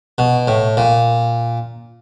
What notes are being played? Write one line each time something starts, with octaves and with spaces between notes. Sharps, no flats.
B2
A2
A#2